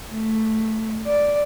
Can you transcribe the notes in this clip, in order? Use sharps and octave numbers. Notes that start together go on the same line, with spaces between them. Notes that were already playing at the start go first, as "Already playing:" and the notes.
A3
D5